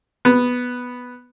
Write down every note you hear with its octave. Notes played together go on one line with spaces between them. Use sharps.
B3